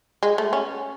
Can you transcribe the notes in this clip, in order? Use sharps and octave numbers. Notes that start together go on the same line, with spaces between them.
G#3
A3
C#4